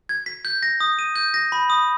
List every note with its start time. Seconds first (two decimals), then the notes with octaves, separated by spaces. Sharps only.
0.09 G#6
0.26 B6
0.45 G6
0.63 A#6
0.80 D#6
0.99 D#7
1.16 G6
1.34 A#6
1.52 B5
1.70 D#6